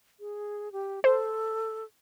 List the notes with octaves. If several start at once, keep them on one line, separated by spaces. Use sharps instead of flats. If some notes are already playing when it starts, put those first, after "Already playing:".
G#4
G4
A4 C5